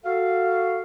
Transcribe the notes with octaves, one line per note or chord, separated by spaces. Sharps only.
F#4 A4 F5